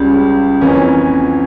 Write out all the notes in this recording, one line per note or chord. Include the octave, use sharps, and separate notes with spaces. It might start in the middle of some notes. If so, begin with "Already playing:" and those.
Already playing: C#2 C#3 G3
F2 E3 A#3 C#4